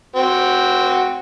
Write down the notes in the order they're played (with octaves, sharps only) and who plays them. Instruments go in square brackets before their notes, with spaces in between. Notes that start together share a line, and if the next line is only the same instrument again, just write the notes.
[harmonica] C4 F#4